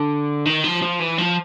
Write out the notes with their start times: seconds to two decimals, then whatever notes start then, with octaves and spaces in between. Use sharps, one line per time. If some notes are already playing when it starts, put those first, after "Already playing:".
Already playing: D3
0.46 D#3
0.64 F3
0.82 F3
1.00 E3
1.18 F3